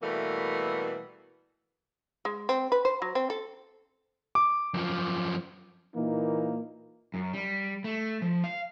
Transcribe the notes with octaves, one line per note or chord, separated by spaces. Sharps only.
B2 E3 G3 A3 A#3
G#3
C4
B4
C5
F#3
C4
A4
D6
F#2 F3
A#2 E3 A#3 D#4
F#2
G3
A3
F3
F5